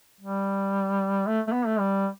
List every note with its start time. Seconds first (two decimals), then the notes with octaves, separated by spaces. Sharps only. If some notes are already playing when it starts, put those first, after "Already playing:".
0.21 G3
1.27 A3
1.48 A3
1.53 B3
1.66 A3
1.80 G3